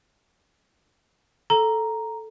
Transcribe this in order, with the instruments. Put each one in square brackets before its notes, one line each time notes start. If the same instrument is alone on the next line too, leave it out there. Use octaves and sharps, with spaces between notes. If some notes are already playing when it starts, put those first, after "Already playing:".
[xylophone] A4 [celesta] A#5